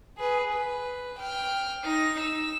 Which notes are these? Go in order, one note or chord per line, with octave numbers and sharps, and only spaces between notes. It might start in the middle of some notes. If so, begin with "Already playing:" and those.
G#4 B4
B4
G5 F6
D#4 A#6
E6